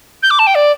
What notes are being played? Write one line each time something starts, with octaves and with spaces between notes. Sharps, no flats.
G6
D6
A5
G5
D5